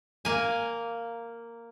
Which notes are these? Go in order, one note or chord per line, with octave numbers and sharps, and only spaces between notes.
A#3 G#5